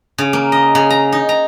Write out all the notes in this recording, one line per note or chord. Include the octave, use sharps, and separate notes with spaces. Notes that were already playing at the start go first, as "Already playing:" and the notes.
C#3
A#3
D#5
C#3
A#5
D#4
A#5